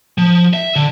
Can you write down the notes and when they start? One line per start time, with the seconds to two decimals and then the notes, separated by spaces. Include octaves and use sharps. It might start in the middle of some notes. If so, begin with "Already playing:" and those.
0.18 F3
0.54 E5
0.76 D3